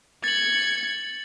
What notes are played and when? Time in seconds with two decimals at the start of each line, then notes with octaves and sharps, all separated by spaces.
0.24 G#6 A6 C#7 F#7